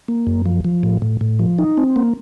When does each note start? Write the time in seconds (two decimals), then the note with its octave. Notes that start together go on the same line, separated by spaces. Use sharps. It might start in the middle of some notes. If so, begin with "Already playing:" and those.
0.08 A#3
0.27 F#2
0.46 F3
0.65 F3
0.83 A2
1.02 A2
1.21 A2
1.39 F3
1.59 D#4
1.77 C4
1.96 A#3